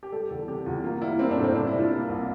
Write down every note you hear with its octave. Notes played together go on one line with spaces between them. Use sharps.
G4
G3 A4
E2 A4
C3 G4
E2 F4
A#3 F4
G3 E4
A#3 C4
D4
A2
C4
C3 D4
E4
G3
F4
A#3
C2